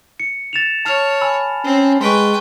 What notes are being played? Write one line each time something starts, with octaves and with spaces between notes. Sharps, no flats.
C#7
A6 E7 F7
C#5 A5 F6 F7
G#5 B5 E6
C4 C#4
G#3 B4 G5 C6 C#6